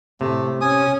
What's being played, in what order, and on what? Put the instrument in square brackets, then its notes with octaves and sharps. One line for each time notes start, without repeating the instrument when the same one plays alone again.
[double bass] A2 [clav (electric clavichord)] C3 [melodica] A3
[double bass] C#4 [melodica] G#5 D#6